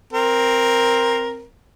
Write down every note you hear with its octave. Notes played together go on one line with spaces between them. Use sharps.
C4 A#4